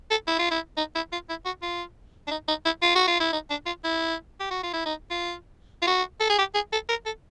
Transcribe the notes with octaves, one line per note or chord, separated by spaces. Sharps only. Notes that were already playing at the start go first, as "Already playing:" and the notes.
A4
E4
F4
E4
D#4
E4
F4
E4
F#4
F4
D4
D#4
D#4
E4
F4
F#4
F4
E4
D#4
D4
F4
E4
G4
F#4
F4
E4
D#4
F4
F4
F#4
A4
G#4
G4
G#4
A4
A#4
A4